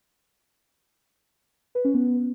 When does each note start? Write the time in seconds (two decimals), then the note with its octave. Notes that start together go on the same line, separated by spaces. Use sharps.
1.75 B4
1.85 C#4
1.94 B3